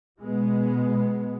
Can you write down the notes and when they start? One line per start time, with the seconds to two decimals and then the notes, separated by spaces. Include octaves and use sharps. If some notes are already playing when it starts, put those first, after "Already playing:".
0.21 B2 G#3 B3